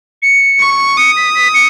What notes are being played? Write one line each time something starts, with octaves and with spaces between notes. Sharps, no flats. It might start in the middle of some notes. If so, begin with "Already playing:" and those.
C#7
C#6
D#6 C#7
B6
B6
C#7